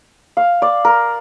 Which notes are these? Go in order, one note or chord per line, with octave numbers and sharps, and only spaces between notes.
F5
D5
A#4